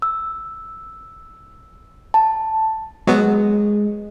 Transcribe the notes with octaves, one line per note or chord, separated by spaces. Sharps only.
E6
A5
F#3 G#3 B3